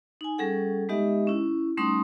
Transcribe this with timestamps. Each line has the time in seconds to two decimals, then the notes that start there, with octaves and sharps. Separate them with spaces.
0.21 D#4 G#5
0.38 G3 C#4 G#4 A4 F#5
0.89 G#3 B3 D#4 G4 D#5 E5
1.27 C#4 E4
1.77 G3 A3 C#4 D#4 C6 D#6